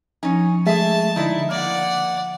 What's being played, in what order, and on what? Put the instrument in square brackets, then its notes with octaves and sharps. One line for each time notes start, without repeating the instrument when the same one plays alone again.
[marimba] F3 [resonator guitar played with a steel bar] C#4 D#4 [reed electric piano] G#5
[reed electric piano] G#3 A3 [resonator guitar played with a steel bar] G#4 E5 [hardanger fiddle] A5
[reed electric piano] D3 D#5 [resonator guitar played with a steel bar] D#4 E4 D5
[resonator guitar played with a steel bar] A#3 [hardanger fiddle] D5 F#5